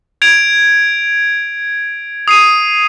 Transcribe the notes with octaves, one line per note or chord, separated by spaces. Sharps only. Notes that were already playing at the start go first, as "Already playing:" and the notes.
G#6 D7 F7
D#6 C7 D#7